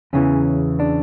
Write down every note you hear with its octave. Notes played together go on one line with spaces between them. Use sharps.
E2 C#3 E3 C#4
D4